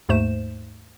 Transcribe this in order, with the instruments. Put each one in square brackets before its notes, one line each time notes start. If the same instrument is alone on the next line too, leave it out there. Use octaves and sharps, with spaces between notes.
[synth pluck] D#2 G#2 A3 C5 E7